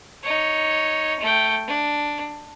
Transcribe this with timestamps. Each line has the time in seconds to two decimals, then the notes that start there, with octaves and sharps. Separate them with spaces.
0.23 D#4 C#5
1.20 A3 G5
1.67 D4